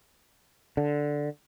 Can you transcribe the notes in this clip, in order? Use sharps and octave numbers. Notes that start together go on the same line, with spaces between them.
D3